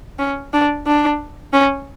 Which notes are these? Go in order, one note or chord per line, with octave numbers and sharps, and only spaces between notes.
C#4
D4
D4
C#4